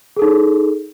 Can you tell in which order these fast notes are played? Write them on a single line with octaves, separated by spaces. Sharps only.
G#4 A4 D#4